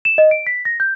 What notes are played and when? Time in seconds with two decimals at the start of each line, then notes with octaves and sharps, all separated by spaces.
0.05 E7
0.18 D#5
0.31 D7
0.47 B6
0.65 A#6
0.80 G6